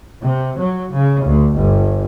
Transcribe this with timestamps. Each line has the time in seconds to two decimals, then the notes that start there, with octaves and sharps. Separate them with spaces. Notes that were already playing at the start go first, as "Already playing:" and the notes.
0.22 C3
0.58 F#3
0.93 C#3
1.24 D2
1.56 G1